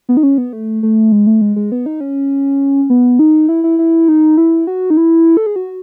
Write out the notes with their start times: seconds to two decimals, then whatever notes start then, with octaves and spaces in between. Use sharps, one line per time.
0.09 B3
0.17 D#4
0.23 C#4
0.38 B3
0.53 A3
0.83 A3
1.12 G#3
1.27 A3
1.41 G#3
1.56 G#3
1.72 B3
1.86 D#4
2.01 C#4
2.90 B3
3.19 D#4
3.49 E4
3.64 E4
3.79 E4
4.08 D#4
4.38 E4
4.67 F#4
4.90 D#4
4.97 E4
5.37 A4
5.46 G#4
5.56 F#4